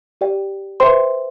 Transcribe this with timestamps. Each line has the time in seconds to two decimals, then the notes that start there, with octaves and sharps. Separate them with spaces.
0.21 G4 D5 G5
0.80 B4 C5 E5 G5 C6